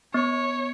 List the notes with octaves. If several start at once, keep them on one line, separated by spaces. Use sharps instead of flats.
B3 C#5